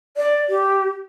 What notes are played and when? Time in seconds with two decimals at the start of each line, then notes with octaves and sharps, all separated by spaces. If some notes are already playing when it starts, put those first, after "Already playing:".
0.17 D5
0.49 G4